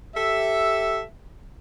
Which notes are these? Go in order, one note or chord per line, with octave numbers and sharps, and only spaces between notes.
G4 A4 E5